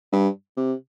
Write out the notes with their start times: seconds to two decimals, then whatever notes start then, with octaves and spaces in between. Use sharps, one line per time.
0.13 G2
0.57 C3